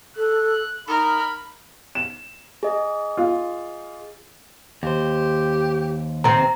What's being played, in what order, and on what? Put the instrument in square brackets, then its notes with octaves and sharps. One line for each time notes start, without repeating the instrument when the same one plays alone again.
[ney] A4 [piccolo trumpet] F#6
[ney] D#4 [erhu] A#4 [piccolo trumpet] B5
[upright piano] E7
[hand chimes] G#4 D#5
[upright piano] F4
[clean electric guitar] D#2 C5 [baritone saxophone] G4
[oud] C3 C4 [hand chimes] A#5